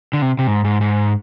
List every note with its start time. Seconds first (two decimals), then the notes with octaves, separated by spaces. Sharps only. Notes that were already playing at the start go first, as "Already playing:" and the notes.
0.13 D3
0.22 C3
0.39 C3
0.47 G#2
0.65 G#2
0.81 G#2